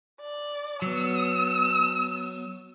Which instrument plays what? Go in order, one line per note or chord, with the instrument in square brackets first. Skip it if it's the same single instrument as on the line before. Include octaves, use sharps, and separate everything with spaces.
[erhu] D5
[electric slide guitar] F#3 B3 [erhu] E6